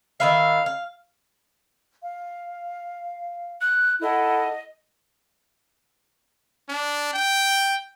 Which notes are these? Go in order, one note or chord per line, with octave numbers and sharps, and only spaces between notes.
D#3 B4 E5 F5
F5
F5
F#6
E4 A4 D#5 F#5
D4
G5